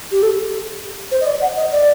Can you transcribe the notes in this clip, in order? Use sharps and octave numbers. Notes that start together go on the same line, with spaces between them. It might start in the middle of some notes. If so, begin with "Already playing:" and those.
G4
A4
C5
D#5
D5
F#5
D#5
D5